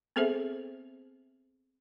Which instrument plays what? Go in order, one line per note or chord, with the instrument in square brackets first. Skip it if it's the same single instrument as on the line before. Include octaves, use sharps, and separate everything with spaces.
[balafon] B3 C4 G#4 A4 C5 E5